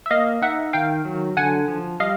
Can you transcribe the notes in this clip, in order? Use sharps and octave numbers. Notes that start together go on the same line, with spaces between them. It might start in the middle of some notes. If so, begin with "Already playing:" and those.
E5
A#3 D#5 F5
D#4 E5 F#5
D#3 F5 G5
F#3
D3 F#5 G#5
F3
G3 D#5 F5